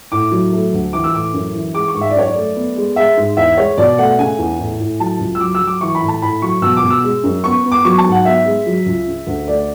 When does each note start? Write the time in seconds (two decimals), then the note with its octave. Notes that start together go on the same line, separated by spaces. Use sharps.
0.12 A2 D6
0.31 F#3
0.52 A3
0.73 D2
0.93 E3 D6
1.04 E6
1.13 A2 D6
1.33 F#2
1.54 E3
1.74 G#3 D6
1.88 C#6
1.94 G#2
2.01 E5
2.10 D5
2.15 F#2 C#5
2.28 D5
2.35 A3
2.55 B3
2.76 G#3
2.96 G#3 E5
3.17 G#2
3.37 E2 E5
3.57 G#3 C#5
3.77 B2 D5
3.98 A3 F#5
4.19 C#3 G#5
4.38 E2
4.59 A2
4.80 A2
4.99 F#3 A5
5.20 C#2
5.35 E6
5.40 F#3 D6
5.55 E6
5.61 F#3
5.67 D6
5.81 E3 C#6
5.95 B5
6.02 A2
6.08 A5
6.22 A2 B5
6.42 F#3 C#6
6.62 B2 E6
6.77 D6
6.83 B2
6.90 E6
7.04 G#3
7.23 F#2
7.44 B3 C#6
7.64 B3
7.72 D6
7.85 F#3 C#6
7.98 A5
8.05 G#2
8.12 F#5
8.25 B3 E5
8.45 G#3
8.66 F#3
8.86 C#2
9.07 C#3
9.27 D2
9.47 A3 D5